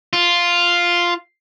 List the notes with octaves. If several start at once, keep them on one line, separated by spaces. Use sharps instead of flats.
F4